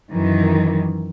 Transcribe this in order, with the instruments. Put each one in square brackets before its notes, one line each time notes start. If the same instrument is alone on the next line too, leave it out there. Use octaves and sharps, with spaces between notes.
[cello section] F#2 D#3 E3